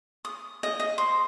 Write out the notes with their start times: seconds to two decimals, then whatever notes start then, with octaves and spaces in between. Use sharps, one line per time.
0.25 D#6
0.63 D#5
0.80 D#5
0.98 C5